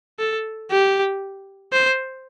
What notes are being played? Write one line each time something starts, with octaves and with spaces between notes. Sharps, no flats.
A4
G4
C5